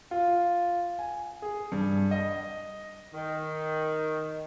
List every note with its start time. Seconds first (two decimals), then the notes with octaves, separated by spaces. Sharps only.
0.11 F4
0.99 G#5
1.42 G#4
1.72 G2
2.11 D#5
3.14 D#3